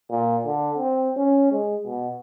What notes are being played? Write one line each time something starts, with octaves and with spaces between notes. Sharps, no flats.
A#2
D3
C4
C#4
G#3
B2